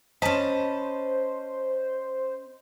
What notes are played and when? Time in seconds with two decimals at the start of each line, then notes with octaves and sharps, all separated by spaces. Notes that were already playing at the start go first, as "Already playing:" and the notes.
0.22 C#4 C5 D#5 A5 B5